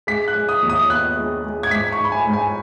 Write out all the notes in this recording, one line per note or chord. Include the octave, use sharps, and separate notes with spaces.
G#3 B6
F#6
G#3
D#6
D#2
D#6
B3 F#6
G#3
G#3
G#6
G#2 B6
C#6
G#2
B5
G#5
G#2
G#5